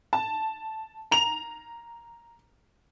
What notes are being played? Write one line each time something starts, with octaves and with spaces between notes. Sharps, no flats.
A5
A#5 F7